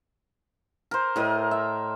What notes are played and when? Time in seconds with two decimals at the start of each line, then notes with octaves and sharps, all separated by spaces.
0.91 A#4 C5
1.16 A2 A#4 D#5
1.51 E5